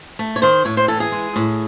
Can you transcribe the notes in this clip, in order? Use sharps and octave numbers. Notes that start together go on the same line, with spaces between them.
A3
C#5
D#3 C5
A2 C#5
C5
E3 A4
G#4
G#3
A2